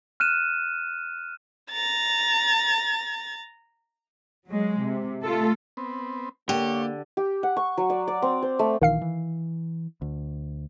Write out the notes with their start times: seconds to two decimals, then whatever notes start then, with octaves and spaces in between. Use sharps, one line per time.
0.20 F6 F#6 D#7 E7
1.71 A#5 A6
4.48 F#3 G#3
4.82 C3
5.24 A3 F4 A4
5.77 B3 C4
6.49 D3 A#3 G4 C#5
7.17 G4
7.43 F#5
7.57 C#6
7.78 F#3
7.90 D5
8.08 D5
8.22 C4
8.42 C5
8.59 A3
8.82 A#1 D#3 E3 F5 C7
9.02 E3
10.02 D2